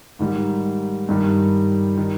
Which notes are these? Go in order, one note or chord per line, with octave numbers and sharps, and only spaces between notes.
G#2 D#3 G3
G2 D#3 G3
D#3